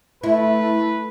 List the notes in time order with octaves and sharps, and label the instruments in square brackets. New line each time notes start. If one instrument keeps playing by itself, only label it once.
[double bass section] A3 [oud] E4 [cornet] B4